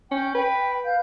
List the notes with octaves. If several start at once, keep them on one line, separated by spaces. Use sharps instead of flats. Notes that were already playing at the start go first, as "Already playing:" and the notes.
C#4 G5 G6
B4 G5
B4 F5 G6